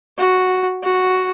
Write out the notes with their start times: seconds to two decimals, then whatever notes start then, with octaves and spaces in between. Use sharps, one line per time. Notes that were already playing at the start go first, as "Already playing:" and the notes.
0.18 F#4
0.84 F#4